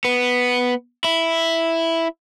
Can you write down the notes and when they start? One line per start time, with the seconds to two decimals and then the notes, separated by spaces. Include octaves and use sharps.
0.05 B3
1.04 E4